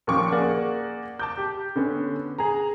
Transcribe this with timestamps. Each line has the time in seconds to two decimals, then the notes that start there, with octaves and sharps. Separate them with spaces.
0.07 D#2 A#2 F3 C#4 C#6 D6
0.32 A#3 G#4 D5 F#5
1.19 A5 D6 G6
1.38 G4
1.76 D3 B3 C#4
2.39 G#4 A#5